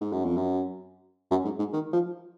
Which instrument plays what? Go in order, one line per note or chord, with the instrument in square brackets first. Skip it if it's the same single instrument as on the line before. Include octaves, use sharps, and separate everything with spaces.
[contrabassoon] G#2
F#2
F2
F#2
F#2
G#2
G#2
D#3
F3